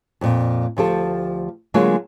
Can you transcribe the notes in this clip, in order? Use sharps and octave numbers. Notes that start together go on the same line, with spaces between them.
F2 A#2
D2 F3 G4 A4
D3 F#3 G#3 A#3 F4 G#5